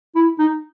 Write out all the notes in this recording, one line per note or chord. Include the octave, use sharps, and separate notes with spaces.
E4
D#4